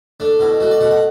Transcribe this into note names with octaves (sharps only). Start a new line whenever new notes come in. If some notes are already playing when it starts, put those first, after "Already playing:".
A3 D4
B2 E4
A3 F#4
D5
B2 F#5
F#5